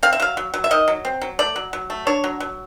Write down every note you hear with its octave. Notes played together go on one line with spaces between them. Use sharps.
C4 F5
E5
F#3 F5
F#3
F#3
E5
D#3 D#5
F#3
C4
F#3
A3 D5
F#3
F#3
A3
D4 C#5
F#3
F#3